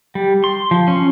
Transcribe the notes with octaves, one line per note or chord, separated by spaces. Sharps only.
G3
C6
F3
C#4